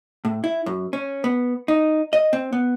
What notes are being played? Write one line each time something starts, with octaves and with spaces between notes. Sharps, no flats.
A2
E4
F#2
C#4
B3
D#4
D#5
C4
B3